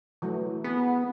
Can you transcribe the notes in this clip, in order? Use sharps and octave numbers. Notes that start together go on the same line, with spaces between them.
E3 F#3 A3
B3 G#4